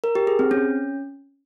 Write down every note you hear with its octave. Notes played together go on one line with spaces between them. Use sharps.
A#4
G4
G#4
C4
C#4